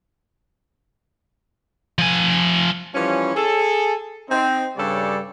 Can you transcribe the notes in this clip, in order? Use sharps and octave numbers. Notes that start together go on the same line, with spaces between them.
F3 G#5
E3 F3 G3 C#4
G#4 A4
C4 D#4
G2 C#3 G3 A4 C#5 D5